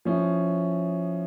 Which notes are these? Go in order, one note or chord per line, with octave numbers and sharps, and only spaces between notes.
F3 C#4 E4